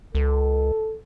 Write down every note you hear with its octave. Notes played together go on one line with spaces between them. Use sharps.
C#2 A4